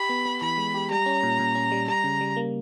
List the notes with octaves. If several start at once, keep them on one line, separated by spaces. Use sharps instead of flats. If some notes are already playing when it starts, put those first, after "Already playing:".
Already playing: G4 B5
B3
B3
E3 B5
G#3
G4
G3 A#5
C#4
A#2
A#2
C#4
G3
G3 A#5
C#3
G3
A#3